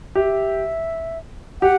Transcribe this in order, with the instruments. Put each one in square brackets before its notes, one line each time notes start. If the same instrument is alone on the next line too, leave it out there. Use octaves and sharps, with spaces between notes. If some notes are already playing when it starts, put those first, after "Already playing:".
[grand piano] G4 [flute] E5
[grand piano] G4 [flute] F#5